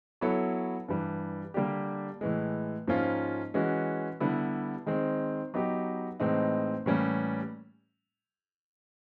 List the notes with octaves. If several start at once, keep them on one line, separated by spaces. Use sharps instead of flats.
F#3 B3 E4 A4 C#5
G2 E3 G3
D3 G3 A#3 D4 G4
A2 E3 G#3
G#2 F3 A#3 C#4 F4
E3 G#3 C#4 F#4
D3 G3 B3 E4
D#3 G#3 C4
F#3 B3 D#4 G4
A2 E3 G#3 C4 D#4
A2 E3 G3 A#3 C#4